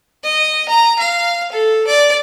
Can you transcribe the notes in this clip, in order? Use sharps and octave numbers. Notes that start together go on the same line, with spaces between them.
D#5
A#5
F5
A4
D5